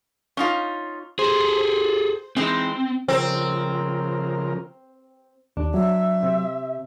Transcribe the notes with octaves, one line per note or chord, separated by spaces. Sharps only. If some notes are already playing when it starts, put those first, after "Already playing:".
C#4 D#4 F4
G#4 A4 C5
E3 G#3 C4 D#4
C#3 F3 C4 A#4
D#2 D4
F#3 E5
C3